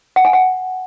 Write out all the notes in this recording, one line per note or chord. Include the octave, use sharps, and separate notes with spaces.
F#5
G#5
F#5